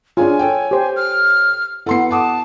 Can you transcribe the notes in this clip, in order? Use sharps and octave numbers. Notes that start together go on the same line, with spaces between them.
D4 F4 G#4 C#5 G#5
A4 C#5 G5
G4 C5
F6
B3 E4 A4 F#5 C6 C7
F#5 A5 D6 D#6